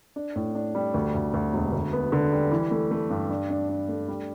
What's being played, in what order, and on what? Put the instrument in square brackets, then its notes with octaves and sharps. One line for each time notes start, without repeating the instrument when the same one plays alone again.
[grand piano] D4
A2
D4
G3
D2
D2
D2
E1
D2
B3
D3
G3
E3
A3
A3
G2
D4
D4
D4
A3
G3